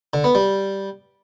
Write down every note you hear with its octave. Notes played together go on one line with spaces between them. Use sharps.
D3
B3
G3